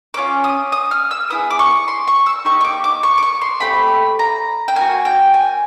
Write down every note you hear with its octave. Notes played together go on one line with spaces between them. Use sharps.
A#3 C#4 F4 D6
D#6
D#6
F6
E6
B3 E4 G#4 D#6
D6
C#6
C6
C#6
E6
A#3 D#4 G4 C#6
C#6
D6
D6
C#6
D6
C#6
C6
A3 C4 G4 B5
A#5
G5
A#3 D#4 G#5
F#4
G5
G#5